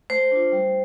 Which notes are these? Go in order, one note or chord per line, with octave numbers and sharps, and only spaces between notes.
A3 C5
D4 F4
G3